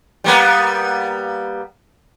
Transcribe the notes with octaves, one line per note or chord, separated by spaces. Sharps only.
G3 A#3 B3